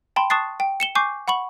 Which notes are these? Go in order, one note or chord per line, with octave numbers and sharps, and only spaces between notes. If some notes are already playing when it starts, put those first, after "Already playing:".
G5 A5 B5 C6
A5 C#6 D#6 F#6 A6 C7
G5
C#7 E7 G7
G#5 C#6 D6 G6 C7
F#5 B5 C#6 F#7